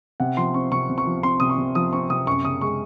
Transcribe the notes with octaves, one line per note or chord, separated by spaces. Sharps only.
C3 F#5
F3 C6
C4 C#6
C3 C#6
C3
C#6
F3
C4 C6
C3 D#6
C#6
C3
F3 D#6
C4 C#6
C3 D#6
F#2 C#6
C#3 D#6
G#3 C#6